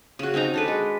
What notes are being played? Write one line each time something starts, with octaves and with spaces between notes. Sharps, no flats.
C#3 F#4
C4 C#4 D#4 A#5
D4 A4 B4
G#3